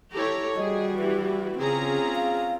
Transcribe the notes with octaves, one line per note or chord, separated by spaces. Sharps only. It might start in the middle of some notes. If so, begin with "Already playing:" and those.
E4 G4 A4 C#5 A#5
G3 F#4 G#4 D#5
E3 G4
C#3 C4 C#4 F4 G#4 A#5
F5